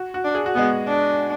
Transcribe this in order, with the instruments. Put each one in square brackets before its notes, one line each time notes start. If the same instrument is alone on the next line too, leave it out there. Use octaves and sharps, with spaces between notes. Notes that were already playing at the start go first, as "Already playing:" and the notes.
Already playing: [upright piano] F#4
F#4
[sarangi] D4
[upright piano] G#4
F#4
[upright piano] G#3 G#4 [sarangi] B3
[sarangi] D4